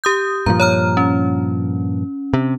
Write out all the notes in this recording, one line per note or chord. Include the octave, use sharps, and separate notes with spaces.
G4 D#6 G6
G2 A#2 F3 A#5
C#5 A#5 F6
C#4
C3